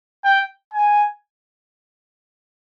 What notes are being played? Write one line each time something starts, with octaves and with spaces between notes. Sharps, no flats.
G5
G#5